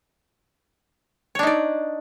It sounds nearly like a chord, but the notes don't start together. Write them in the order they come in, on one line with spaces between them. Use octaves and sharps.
C#5 D4 D#4 D5